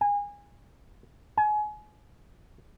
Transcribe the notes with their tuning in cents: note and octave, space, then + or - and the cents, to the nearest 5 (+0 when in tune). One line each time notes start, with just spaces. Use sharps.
G#5 -25
G#5 +30